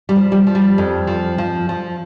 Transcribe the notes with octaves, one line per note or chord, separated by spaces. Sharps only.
G3
F3
G3
F3
G3
F2
F3
F3
F3